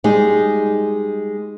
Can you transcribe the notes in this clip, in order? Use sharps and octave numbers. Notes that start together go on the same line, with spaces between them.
G3 G#3 D#4